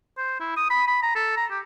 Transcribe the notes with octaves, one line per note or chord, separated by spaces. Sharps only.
C5
E4
D#6
B5
B5
A#5
A4
A#5
G4